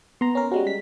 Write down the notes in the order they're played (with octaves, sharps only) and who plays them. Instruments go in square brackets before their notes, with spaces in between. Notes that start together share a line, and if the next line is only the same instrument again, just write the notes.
[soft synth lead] B3 [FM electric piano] A#5 C6
[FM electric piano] C#4 A#4
[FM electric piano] G3 G#3 C#4 [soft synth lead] F#4
[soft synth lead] B6